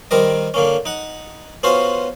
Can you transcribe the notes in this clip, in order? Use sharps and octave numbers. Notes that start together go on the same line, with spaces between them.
D#3 G3 C4 A#4 D#5
D3 A#3 C#4
D#4 F#5
B3 C#4 F4 F#4 C5